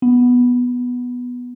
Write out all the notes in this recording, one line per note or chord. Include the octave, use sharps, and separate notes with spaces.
B3